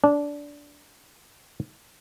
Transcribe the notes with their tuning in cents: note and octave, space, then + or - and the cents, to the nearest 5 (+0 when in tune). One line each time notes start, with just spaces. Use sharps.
D4 -15